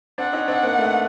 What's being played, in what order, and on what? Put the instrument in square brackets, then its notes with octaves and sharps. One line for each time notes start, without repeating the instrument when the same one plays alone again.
[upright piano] C4 D4 [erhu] F#5
[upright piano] C#4 D#4
C4 D4
A#3 C4
A3 B3